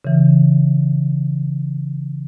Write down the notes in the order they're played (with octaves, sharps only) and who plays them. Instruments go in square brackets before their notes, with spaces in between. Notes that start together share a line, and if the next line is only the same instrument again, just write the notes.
[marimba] C#3 E3